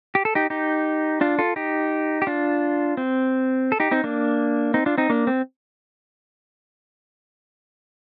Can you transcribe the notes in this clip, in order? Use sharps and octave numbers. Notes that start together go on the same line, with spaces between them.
G4
A4
D#4 G4
D#4 G4
D4 F4
F4 A4
D#4 G4
G4
D4 F4
C4
A4
D#4 G4
C4 D#4
A#3 D4
C4 D#4
D4 F4
C4 D#4
A#3 D4
C4